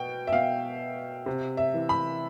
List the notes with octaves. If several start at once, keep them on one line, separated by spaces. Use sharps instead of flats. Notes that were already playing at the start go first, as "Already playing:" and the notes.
Already playing: B2 G5
E5
B2 F5
C3
E5
E3
B5